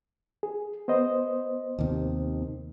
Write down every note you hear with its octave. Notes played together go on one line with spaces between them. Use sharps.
G#4
B3 C5 D#5
D#2 C3 D#3